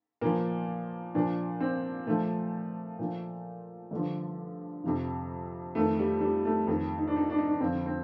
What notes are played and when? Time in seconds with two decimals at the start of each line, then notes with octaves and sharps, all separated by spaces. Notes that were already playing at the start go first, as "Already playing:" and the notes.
0.21 A#2 F3 A#3
1.15 A#2 F3 D4
1.60 C4
2.06 A#2 F3 A3
2.99 A#2 F3
3.91 G2 D3 F3
4.84 F2 C3 F3
5.75 F2 D#3 A3
5.99 G3
6.21 G3
6.45 A3
6.67 F2 D#3
6.98 D#4
7.07 D4
7.16 D#4
7.30 D4
7.38 D#4
7.48 D4
7.60 F2 D3 F3 C4
7.86 C4